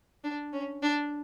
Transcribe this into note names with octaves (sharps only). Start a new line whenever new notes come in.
D4
C#4
D4